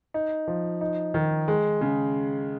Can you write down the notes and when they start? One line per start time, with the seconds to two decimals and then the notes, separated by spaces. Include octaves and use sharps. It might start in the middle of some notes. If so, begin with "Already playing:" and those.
0.14 D#4
0.48 F3
0.81 D#4
1.14 D#3
1.48 G#3
1.81 C#3